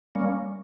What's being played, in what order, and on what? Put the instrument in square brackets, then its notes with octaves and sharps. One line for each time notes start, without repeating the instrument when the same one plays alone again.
[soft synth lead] G3 [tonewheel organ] A#3 C#4